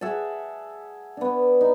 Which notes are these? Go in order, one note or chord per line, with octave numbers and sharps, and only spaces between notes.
G#4 E5 F#5 A5
B3 D4
D#4